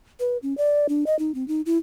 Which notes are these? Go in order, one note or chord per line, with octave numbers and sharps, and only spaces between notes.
B4
C#4
D5
D4
D#5
D#4
C4
D#4
E4